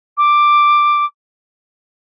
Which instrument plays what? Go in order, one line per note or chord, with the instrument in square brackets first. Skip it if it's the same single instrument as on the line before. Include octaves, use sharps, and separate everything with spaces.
[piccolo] D6